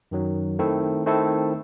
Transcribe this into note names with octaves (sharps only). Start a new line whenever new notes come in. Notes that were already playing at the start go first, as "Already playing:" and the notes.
F#2 D#3 F#3
D#3 A3 C4 E4 A4
D#3 A3 C4 E4 A4